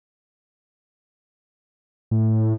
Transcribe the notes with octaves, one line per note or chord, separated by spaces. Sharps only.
A2